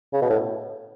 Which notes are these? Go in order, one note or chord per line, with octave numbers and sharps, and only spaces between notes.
C#3
B2
A2